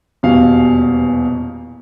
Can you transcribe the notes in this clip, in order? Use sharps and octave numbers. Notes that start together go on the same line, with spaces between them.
D#1 E2 B2 F5